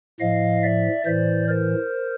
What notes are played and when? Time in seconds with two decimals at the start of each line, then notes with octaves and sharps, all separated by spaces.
0.20 A2 F3 D#5 F5
0.63 D5 E5
1.05 A2 E3 C5 D5
1.48 A#4 C5